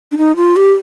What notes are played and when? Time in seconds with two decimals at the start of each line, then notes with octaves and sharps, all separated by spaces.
0.12 D4
0.18 D#4
0.36 F4
0.56 G4